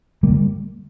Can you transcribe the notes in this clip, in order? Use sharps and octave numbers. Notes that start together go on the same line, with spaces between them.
D3 G3 A#3